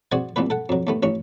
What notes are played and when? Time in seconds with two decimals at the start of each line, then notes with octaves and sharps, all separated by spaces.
0.12 C4 F#4 G#4 D5 F#5 G#5
0.36 C2 A#2 E3 B3 B4
0.50 A4 F#5
0.69 F2 F#3
0.87 D#2 A3 B3
1.03 A1 E3 C#4 C#6